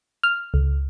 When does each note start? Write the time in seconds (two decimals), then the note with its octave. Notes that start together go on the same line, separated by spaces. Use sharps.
0.23 F6
0.54 C#2